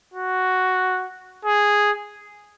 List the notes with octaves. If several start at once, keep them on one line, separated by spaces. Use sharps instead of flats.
F#4
G#4